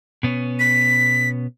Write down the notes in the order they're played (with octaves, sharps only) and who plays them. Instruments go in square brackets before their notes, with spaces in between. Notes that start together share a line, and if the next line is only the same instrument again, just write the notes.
[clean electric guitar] B2 B3 C#4
[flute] B6